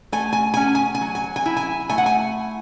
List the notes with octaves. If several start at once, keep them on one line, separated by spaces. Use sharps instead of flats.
A3 G#5
G#5
C#4 G#5
G#5
G#5
F#3
G#5
G#5
E4
G#5
A3 G#5
F#5
G#5